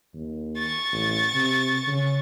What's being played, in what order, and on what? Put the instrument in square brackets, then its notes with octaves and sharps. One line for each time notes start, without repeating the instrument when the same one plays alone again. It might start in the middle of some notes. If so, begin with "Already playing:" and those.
[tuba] D#2
[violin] C#6 A6
[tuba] A1
C3
C#3